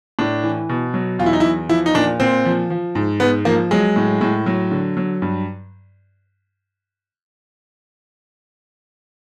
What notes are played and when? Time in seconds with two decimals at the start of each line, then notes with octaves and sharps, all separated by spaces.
0.19 A2 D4
0.43 E3
0.69 B2
0.94 F#3
1.19 E2 F4
1.26 E4
1.33 D#4
1.40 E2 E4
1.69 F3 E4
1.86 D#4
1.94 A#2 D4
2.20 A#2 C4
2.45 F3
2.70 F3
2.95 G#2
3.20 G#2 B3
3.45 F3 A#3
3.71 F#3 G#3
3.96 A2
4.21 A2
4.46 F#3
4.71 D3
4.97 F#3
5.22 G2